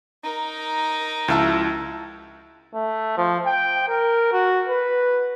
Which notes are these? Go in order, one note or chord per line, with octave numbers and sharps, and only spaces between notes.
D#4 A#4
C#2 F3 E4 F#4 A5
A3
F3
G5
A#4
F#4
B4